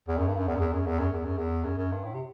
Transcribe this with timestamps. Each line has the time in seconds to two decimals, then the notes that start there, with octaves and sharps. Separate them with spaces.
0.08 E2
0.18 F#2
0.28 G2
0.37 F#2
0.48 E2
0.56 F#2
0.60 E2
0.73 F#2
0.86 E2
0.99 F#2
1.13 E2
1.26 F#2
1.38 E2
1.65 F#2
1.78 F#2
1.92 G2
2.05 A2
2.14 C3